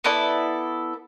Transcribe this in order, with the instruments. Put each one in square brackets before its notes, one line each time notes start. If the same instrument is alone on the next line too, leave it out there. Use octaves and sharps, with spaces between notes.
[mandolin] B3 E4 A4 D5